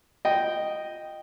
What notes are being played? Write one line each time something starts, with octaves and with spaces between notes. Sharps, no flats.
D#5 G5